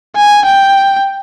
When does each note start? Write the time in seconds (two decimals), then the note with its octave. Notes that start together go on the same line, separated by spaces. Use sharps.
0.16 G#5
0.45 G5